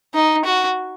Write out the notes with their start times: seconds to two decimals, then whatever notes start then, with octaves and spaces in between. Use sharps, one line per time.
0.15 D#4
0.45 F#4